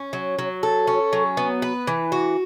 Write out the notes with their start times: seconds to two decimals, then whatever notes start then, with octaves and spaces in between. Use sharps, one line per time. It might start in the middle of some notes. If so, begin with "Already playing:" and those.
Already playing: C#4
0.13 F#3
0.39 F#3
0.63 A4
0.87 C#4
1.13 F#3
1.37 B3
1.62 B4
1.87 E3
2.12 F#4